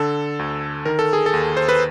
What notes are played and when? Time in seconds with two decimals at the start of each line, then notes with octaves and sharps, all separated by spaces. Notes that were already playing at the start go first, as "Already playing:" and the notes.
Already playing: D3 A4
0.39 D2
0.85 D#3 A#4
0.99 A4
1.13 G#4
1.26 A4
1.34 D#2
1.57 C5
1.69 B4